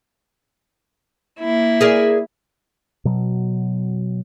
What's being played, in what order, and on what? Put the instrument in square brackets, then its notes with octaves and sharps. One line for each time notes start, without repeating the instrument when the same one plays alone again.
[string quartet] A#3 E4
[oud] G#4 A#4 D5
[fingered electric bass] B2 F#3